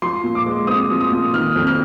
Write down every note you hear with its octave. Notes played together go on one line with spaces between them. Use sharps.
F3 C6
A#2
D6
G#3
C4 D#6
F3
D#6
A#2
D#3 F6
F2
F6